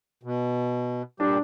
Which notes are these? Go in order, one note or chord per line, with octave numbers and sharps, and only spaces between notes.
B2
A#2 G3 D4 G4